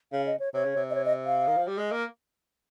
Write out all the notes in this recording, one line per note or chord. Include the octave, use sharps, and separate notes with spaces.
C#3 F5
D#5
C#5
C3 C#5
C#3
C3
D#5
C#5
D#5
F5
D#3
F3
G3
G#3 D#5
A#3